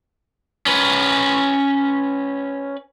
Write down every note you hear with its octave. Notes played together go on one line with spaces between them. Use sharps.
C#4 B4